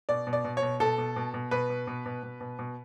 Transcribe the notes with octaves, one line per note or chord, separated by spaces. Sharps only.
B2 D5
B2
D5
B2
C#5
B2
B2 A4
B2
B2
B2
B2 B4
B2
B2
B2
B2
B2
B2